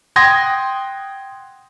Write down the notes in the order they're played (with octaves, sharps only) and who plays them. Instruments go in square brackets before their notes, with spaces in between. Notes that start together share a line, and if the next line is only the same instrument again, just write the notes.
[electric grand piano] F#5 G5 C6 D#6 G#6 A#6